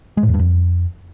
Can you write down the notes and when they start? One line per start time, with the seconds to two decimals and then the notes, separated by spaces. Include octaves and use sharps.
0.17 G#3
0.23 A2
0.28 E2
0.34 G2
0.39 F2